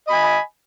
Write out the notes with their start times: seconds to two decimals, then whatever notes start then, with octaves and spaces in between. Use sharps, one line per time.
0.07 D#5
0.10 B5
0.12 G#5